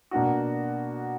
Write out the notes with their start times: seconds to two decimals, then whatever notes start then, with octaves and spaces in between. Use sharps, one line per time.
0.11 B2 A#3 D4 F#4